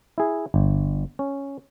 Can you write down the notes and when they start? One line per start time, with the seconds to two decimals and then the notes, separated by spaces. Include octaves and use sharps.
0.18 E4 G#4
0.54 G1
1.19 C#4